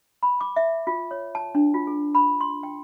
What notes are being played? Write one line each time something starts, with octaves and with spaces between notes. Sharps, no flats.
B5
D6
E5
F4
C#5
A5
D4
F4
G#4
B5
C6
G5